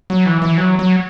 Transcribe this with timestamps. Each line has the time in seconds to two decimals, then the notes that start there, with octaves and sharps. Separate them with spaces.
0.10 F#3
0.26 E3
0.42 E3
0.58 F#3
0.79 F#3